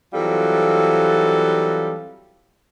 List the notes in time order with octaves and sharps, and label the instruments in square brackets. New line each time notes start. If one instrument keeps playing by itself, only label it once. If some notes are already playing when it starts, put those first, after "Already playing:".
[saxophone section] E3 F#3 G3 C4 F4 A4